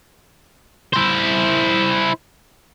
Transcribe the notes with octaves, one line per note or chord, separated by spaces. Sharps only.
E4 C5